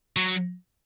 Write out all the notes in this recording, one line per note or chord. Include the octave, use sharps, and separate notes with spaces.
F#3